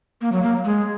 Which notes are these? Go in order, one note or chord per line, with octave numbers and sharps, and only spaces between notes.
A#3
F#3
A#3
G#3